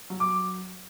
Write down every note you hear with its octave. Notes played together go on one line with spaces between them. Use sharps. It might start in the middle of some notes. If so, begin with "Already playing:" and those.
F#3
D6